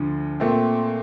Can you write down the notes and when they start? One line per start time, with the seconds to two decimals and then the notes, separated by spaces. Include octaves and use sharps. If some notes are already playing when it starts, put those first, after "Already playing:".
Already playing: D2 D3 F3
0.40 A#2 A3 C4